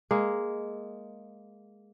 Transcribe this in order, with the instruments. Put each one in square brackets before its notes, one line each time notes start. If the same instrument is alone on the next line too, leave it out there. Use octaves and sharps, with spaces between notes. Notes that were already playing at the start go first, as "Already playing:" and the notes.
[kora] G#3 A#3